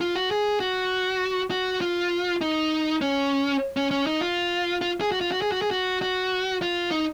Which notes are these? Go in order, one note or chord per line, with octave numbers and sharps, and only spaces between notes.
F4
F#4
G#4
F#4
F#4
F4
D#4
C#4
C#4
C#4
D#4
F4
F4
G#4
F#4
F4
F#4
G#4
F#4
G#4
F#4
F#4
F4
D#4